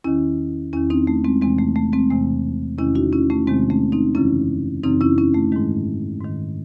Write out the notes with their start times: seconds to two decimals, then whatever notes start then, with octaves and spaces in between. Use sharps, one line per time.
0.04 E2 D#3 C#4 E4
0.73 E2 D#3 C#4 E4
0.90 C4 D#4
1.07 A3
1.24 G#3 C4
1.41 E2 C3 E3 G#3 C4
1.59 A3
1.76 A3
1.93 G#3 C4
2.10 E2 C3 E3 A3
2.78 E2 C3 D#3 C#4 E4
2.95 D#4 F#4
3.13 C#4 E4
3.30 A3 C#4
3.47 E2 C3 D#3 G#3 C4
3.70 A3 C#4
3.92 C4 D#4
4.15 F#2 C#3 E3 C#4 E4
4.83 F#2 C#3 E3 C4 D#4
5.01 C#4 E4
5.18 C#4 E4
5.35 A3
5.52 G#2 D#3 G#3
6.21 G#2 D#3